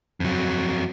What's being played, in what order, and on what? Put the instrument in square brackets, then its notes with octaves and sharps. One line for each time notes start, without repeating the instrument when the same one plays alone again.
[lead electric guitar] F2 F#3